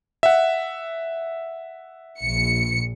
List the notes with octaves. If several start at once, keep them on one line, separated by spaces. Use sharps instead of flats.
E5 F#5
A#1 C#7